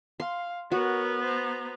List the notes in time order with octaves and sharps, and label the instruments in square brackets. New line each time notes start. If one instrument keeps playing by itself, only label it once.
[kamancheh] F5 [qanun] C6
[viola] B3 [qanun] F#4 [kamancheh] A#4 C#5
[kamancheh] C5 A#5